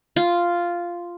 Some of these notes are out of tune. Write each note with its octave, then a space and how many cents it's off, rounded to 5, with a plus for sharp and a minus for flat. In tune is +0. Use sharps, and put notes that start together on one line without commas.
F4 -5